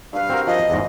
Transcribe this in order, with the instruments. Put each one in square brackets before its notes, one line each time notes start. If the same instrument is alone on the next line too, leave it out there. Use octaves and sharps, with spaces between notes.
[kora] G2 B4 [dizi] F5
[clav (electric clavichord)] C4 F#4 A#4
[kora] F3 [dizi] D#5
[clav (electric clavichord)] E2 G#2